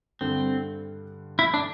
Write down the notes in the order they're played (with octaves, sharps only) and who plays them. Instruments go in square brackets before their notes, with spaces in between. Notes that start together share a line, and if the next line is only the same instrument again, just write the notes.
[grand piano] G2 D3 G3 [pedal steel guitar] C4
[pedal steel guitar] E4
D4